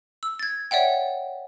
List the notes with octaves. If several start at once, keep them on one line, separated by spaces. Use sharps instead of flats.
E6
G#6 A6
C#5 D5 E5 F#5 G5